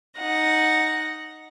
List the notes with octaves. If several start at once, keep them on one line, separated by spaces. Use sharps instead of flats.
D#4 F#5 A#6